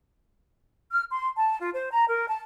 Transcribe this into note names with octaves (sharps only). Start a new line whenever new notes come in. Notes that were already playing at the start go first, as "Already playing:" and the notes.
F6
C6
A5
F4
C5
A#5
A#4
A5